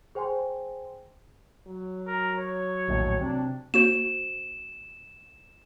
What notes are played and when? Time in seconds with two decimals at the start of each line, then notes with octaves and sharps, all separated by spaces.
0.15 G#4 C5 G5 G#5 C6
1.67 F#3
2.07 A#4
2.39 C#5
2.88 A#1 D#2 A2
3.21 C3 D4
3.74 A#3 F#4 C5 E7